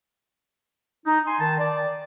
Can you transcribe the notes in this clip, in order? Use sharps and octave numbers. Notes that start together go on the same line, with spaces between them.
D#4
G#5 C6
D#3 A5
D5